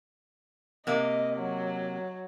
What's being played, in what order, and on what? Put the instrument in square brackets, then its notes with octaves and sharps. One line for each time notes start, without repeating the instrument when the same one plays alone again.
[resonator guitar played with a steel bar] C3 A#3 [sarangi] D#5
[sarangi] F#3